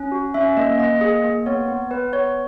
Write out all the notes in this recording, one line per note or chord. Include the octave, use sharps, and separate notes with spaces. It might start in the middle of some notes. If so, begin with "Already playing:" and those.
Already playing: C#4
F#4
C#4 E5
A#3 D#5
A#3 D#5
G#4
A#3
B3 C#5
B3
B3 B4
B3 C#5